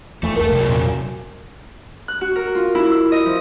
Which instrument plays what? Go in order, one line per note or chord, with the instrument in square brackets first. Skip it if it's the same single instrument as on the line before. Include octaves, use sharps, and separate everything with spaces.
[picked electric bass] F2 E3 [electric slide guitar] A3
[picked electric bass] F#1 C#2 [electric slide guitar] A3 A4 [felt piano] A#4
[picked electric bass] G#1 [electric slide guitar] C3 F#3
[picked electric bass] E2 A#2 C#3
[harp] F#6
F#4
A#4
F4
E4
E6
D#5
F3